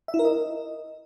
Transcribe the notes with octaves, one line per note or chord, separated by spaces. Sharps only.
E5
E4
A#4
D#5